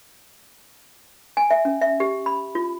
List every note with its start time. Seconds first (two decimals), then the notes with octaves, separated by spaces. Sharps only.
1.37 G#5
1.51 E5
1.65 C#4
1.81 E5
2.00 G4
2.26 B5
2.55 F4